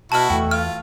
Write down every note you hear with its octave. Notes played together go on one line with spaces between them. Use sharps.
B2 E4 F#4 A5 F6
E2 E3 A3 G5
F4 F6